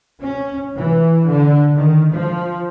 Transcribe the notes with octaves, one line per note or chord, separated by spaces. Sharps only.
C#4
E3
D3
D#3
F3